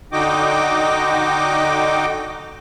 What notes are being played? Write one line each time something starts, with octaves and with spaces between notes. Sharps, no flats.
D3 D#4 F#4 D#5 G5 D6